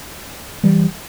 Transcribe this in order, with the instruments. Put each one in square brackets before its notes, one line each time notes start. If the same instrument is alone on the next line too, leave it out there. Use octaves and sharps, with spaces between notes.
[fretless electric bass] E3 G3